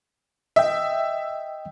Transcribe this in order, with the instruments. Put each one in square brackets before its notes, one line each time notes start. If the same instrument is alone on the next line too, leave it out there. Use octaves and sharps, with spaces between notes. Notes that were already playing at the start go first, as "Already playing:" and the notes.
[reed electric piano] D#5 G5 [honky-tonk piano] E5